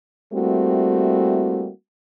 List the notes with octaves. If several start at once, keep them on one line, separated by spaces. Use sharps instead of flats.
G3 A3 A#3 C4 E4 F#4